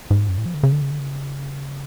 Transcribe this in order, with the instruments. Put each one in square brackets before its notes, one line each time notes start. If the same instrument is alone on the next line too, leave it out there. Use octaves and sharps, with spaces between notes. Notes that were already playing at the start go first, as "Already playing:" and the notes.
[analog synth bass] G#2
F#2
A2
F3
D3
C#3
D3
C#3
D3
C#3